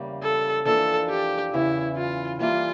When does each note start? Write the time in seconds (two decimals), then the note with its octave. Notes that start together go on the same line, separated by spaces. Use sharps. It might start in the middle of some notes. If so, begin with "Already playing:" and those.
Already playing: E2 C#3 G3 A#3
0.22 A4
0.65 F2 E3 A#3 D4 F4 A4
1.09 G4
1.53 E2 C#3 E3 E4
1.97 F4
2.40 E3 G3 A#3 F4